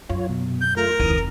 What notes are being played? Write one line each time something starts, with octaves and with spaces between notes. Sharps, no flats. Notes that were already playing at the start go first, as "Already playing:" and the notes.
F#2 F4 C#5
B2
G6
A3 F4 A#4
F1 D2 D#3 E3 D#6